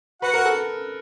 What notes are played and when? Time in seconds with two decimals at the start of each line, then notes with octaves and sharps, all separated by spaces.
0.22 F#4 B4 F#5
0.34 A#4
0.45 A4